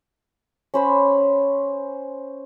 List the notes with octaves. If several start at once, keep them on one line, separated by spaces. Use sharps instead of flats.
C#4 C5 B5